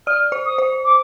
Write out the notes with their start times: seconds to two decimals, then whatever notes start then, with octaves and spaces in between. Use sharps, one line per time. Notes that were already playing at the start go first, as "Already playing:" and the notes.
0.07 D5 F6
0.32 C5
0.46 D#6
0.58 C5
0.85 D6